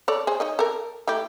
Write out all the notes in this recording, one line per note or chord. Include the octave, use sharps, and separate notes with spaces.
A4 C#5 D5
G#4 C5
D#4 C#5 D#5
A4 A#4
A3 E4 G4